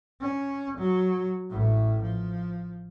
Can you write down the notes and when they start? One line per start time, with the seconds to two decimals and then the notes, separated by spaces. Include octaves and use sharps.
0.21 C#4
0.78 F#3
1.51 A1 A2
2.02 F3